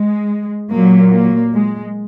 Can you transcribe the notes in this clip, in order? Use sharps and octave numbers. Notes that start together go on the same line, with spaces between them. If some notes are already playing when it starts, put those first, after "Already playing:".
Already playing: G#3
A#2 F#3 A#3
A#3
G#3